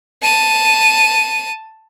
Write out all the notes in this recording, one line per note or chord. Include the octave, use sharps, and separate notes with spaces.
A5 D#7